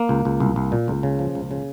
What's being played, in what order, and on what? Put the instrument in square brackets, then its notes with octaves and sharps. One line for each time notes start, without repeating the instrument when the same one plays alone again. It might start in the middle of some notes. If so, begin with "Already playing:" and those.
Already playing: [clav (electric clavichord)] A#3
C#2
C#2
C2
C2
A#2
C#2
C#3
F3
C#2
C#3